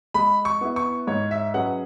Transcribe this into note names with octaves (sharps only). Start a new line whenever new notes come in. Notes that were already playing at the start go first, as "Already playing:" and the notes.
G#3 B5
C#6
B3 E4
C#6
G#2 C#5
E5
F#3 C#4 G#4 B4 F#5